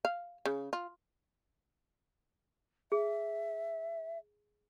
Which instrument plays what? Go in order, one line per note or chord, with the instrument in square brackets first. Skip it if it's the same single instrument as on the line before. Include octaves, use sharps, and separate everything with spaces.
[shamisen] F5
C#3
F4
[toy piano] G#4 [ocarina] E5